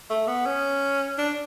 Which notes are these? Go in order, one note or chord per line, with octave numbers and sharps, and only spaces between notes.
A3
B3
C#4
D4